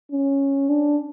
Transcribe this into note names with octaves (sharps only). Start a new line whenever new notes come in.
C#4
D4